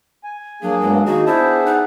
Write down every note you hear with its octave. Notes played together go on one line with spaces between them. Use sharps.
G#5
F#3 A#3 D4 G#4
G2 F#3 G#3 B3
D#3 A#3 D#4 F#4 G#4
B3 D4 E4 G#4 C5 E5 A5
D#4 F#5